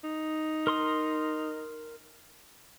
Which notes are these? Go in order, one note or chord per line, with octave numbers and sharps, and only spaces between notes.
D#4
A#4 C6 D#6